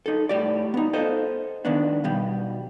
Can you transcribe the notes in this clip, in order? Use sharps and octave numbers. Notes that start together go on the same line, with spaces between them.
D#4 A4
A2 G4 D5
B3 D#4
A4 C5 D#5
D#3 B3 D4
B1 B2 G3